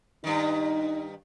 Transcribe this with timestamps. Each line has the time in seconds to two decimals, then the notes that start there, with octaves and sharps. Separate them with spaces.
0.24 G2 D#3 D#4